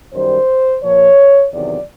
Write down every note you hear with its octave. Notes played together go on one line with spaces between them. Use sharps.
F#2 D#3 G3 C5
A#2 F3 C#5
E2 C3 D#3 F#3 D5